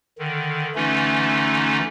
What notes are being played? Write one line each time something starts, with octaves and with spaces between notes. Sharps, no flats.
D3 D#3
D3 E3 A3 C#4 D#4 F4